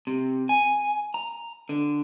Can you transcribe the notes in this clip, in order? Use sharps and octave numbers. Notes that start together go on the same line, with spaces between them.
C3
G#5
A#5
D3